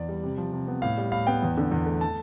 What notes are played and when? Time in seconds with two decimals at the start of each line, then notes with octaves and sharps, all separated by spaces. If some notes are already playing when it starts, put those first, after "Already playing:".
Already playing: E2 D5
0.09 G3
0.23 C3
0.38 F3
0.53 C3
0.68 B3
0.82 A2 F5
0.98 G3
1.12 A2 F5
1.27 B3 G5
1.43 E2
1.57 D3
1.72 E2
1.86 A3
2.01 A5